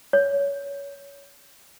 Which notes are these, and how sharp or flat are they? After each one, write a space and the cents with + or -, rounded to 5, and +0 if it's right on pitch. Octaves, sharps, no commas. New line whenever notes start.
C#5 +20